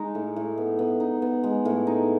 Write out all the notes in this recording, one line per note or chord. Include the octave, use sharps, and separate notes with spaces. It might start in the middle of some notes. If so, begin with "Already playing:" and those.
Already playing: G#3 D#4
A2
A2
B3
B3
D#4
B3
G#3
A2
D#4